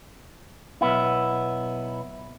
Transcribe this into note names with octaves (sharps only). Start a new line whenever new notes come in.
B1 B3 E4